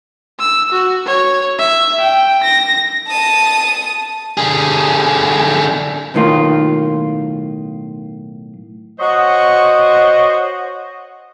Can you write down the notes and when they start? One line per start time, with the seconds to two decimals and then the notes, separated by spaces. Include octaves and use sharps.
0.40 E6
0.72 F#4
1.06 C#5
1.59 E5
2.00 G5
2.43 A#6
3.08 A5 D#6
4.37 D3 G#4
6.14 B1 A2 D#3 A#3 F4
8.99 F#4 C5 C#5 D#5